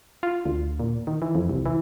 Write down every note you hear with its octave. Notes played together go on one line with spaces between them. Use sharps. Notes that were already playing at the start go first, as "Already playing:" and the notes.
F4
D2
A#2
D#3
E3
F2
C2
E3